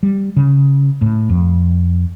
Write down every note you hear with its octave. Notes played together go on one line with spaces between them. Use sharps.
G3
C#3
A2
F2